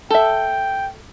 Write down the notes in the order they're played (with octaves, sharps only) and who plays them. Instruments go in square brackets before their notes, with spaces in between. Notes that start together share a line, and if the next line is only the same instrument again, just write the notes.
[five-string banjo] A4 E5 [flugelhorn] G5